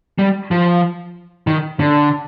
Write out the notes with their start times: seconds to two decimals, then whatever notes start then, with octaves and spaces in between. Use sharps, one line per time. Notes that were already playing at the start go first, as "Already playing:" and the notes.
0.19 G3
0.51 F3
1.47 D#3
1.80 D3